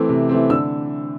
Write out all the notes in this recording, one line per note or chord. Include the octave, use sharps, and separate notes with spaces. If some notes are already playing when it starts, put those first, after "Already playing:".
Already playing: E3 A3 C4 D6
C3
E3 A3 C4
D3 E6